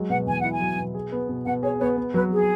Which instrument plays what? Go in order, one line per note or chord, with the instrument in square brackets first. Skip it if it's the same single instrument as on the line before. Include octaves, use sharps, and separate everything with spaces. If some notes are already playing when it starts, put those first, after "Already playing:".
Already playing: [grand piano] F#3 G#3
[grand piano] B2 [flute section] F#5
[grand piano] E2 [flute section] G#5
[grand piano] E4 [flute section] F#5
[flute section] G#5
[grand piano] F#3
B2
G#4
B3
B2
[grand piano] B2 [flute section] F#5
[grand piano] G#4 [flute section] C#5
[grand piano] B3 [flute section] C#5
[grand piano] B3
[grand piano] F#3 [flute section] B4
[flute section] G#4